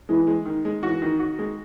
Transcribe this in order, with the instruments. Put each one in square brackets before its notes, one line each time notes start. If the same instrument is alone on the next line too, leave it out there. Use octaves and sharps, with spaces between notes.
[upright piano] E3 [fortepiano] G#3
[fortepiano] G#3
D#3
G#3
[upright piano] E3 [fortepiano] F#4
[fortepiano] D#3
F#4
G#3